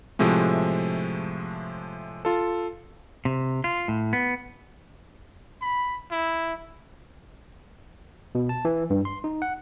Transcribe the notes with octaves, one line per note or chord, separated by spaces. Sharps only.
A2 C3 F3 G#3 A3
F4 A4
C3
F4
A2
B3
B5
E4
B2
A5
E3
G2
C6
D#4
F#5